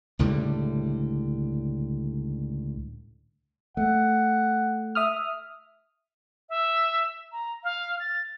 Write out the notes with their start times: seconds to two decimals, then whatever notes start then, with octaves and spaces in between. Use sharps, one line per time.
0.19 C#2 A2 D3 G3
3.77 A3 F#5
4.95 E5 D#6 F6
6.49 E5
7.32 A#5
7.63 F5
8.00 A6